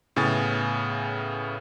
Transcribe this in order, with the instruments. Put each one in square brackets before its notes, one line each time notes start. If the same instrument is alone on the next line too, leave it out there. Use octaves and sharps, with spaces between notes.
[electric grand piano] A2 C#3 B3 G#5 A6